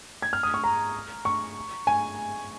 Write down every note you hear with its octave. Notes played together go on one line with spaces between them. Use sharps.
G#6
F6
D#6
C#6
A#5
C#6
G#5